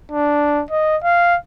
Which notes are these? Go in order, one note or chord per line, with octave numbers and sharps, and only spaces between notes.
D4
D#5
F5